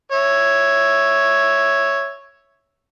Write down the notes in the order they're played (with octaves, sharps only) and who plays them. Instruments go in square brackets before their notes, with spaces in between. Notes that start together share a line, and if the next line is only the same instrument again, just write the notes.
[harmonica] C#5 E5